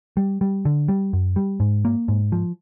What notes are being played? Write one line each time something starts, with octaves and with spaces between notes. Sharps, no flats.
G3
G3
D3
G3
F#2
G3
G#2
A#3
G#2
F3